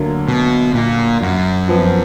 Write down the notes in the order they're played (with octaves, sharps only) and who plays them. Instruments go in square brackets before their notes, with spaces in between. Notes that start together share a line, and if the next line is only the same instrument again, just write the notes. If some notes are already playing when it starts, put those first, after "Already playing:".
Already playing: [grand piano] D2 D3 F#3 A#3
[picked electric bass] B2
A#2
F#2
[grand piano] F2 F3 B3